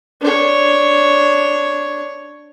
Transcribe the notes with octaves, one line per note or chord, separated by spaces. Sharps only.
D4 C#5